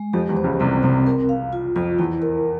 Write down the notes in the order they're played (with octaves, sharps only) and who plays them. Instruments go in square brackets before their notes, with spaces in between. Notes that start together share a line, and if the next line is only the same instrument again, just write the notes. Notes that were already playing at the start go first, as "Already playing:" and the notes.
Already playing: [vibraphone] G#3
[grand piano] F2 F3 [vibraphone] G4
[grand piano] E2 E3
[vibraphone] C5
[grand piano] C#2 C#3
[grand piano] C2 C3 [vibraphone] C4
[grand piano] C2 C3 [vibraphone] C4
[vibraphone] A#4
F5
F4
[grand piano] F2 [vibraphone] F4
[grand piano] E2 [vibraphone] E4
[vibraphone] A#4